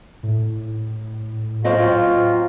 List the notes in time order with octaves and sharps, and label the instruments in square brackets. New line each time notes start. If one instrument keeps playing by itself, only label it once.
[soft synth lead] A2
[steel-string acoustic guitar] F#3 C4 D#5 [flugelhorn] F4